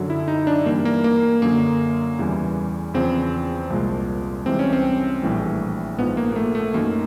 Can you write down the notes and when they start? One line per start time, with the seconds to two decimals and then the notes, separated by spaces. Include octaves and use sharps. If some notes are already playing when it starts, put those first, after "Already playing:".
Already playing: F#2 D3 F#3
0.10 E4
0.28 D#4
0.47 D4
0.66 G2 E3 G3 A#3
0.85 A#3
1.04 A#3
1.42 F#2 D3 F#3 A#3
2.19 E2 C#3 E3 G3
2.94 E2 C#3 F3 C4
3.70 C2 A#2 F3 G#3
4.46 C2 C3 E3 G#3 C4
4.59 C#4
4.73 C4
5.22 A#1 A2 E3 G3
5.98 A#1 G#2 F3 B3
6.17 A#3
6.32 A#3
6.36 A3
6.55 A3
6.74 F#2 D#3 F#3 A#3